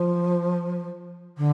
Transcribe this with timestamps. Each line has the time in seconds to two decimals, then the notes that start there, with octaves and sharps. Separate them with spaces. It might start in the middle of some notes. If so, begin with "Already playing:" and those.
Already playing: F3
1.38 D3